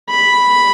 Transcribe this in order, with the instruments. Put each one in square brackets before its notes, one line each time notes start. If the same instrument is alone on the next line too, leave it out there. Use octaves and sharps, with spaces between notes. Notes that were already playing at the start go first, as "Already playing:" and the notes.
[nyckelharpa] B5